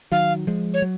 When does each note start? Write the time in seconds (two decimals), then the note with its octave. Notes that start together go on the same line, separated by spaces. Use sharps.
0.12 D#3 F#3 F5
0.47 F3 G#3
0.74 C#5
0.82 F#3